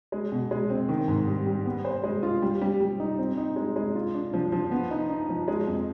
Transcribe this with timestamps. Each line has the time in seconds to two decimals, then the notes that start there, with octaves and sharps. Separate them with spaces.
0.12 G#3
0.32 B2
0.51 G#3
0.70 C4
0.89 D#3
1.08 G#2
1.27 G3
1.46 G3
1.65 B3
1.85 C5
2.04 G#3
2.23 F4
2.42 G3
2.61 G3
2.80 G3
3.00 D#4
3.19 C4
3.37 D#4
3.56 G#3
3.76 G#3
3.95 F4
4.14 D4
4.34 F3
4.52 F3
4.71 B3
4.91 D#4
5.10 D#4
5.29 F3
5.48 G#3
5.67 F2